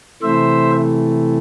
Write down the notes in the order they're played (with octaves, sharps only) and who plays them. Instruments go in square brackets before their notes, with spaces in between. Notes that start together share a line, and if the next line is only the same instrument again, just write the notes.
[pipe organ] C3 E3 A3 C5 E5